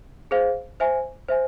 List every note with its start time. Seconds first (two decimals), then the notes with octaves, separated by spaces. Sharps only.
0.31 G#4 C5 F5
0.80 C5 E5 G#5
1.28 C5 E5 G#5